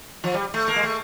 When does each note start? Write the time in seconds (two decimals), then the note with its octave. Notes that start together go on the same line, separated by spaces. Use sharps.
0.24 F3
0.34 G3
0.54 A3
0.68 A#3
0.76 G#3
0.83 A3